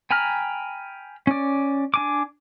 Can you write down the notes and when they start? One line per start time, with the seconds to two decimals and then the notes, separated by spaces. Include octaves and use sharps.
0.11 G5 G#5 A#5 B5 F6
1.27 C#4 D5
1.94 D4 G#5 D6